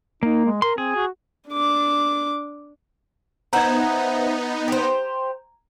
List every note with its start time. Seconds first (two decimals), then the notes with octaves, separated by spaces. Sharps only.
0.23 A#3 D#4
0.45 G#3
0.62 A#4 C6
0.78 C4 G#4
0.95 F#4
1.49 D4 D6
3.53 B3 D#4 C5 E5 F#5 A#5 G#6
4.68 G4 C5